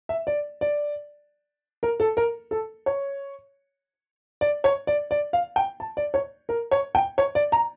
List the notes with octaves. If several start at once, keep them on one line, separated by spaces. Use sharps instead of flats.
E5
D5
D5
A#4
A4
A#4
A4
C#5
D5
C#5
D5
D5
F5
G5
A5
D5
C#5
A#4
C#5
G5
C#5
D5
A#5